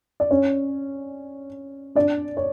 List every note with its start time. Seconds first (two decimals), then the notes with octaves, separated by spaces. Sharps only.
0.20 D5
0.31 C#4 C#5
1.95 D4 D5
2.37 C#5